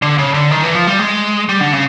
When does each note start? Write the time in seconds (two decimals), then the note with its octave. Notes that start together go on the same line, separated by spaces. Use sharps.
0.02 D3
0.18 C#3
0.34 D3
0.51 D#3
0.63 E3
0.75 F3
0.87 G3
0.99 G#3
1.49 G3
1.60 D3
1.73 C#3